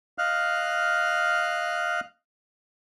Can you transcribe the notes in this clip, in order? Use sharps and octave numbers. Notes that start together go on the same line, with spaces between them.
D#5 F5 F6 F#6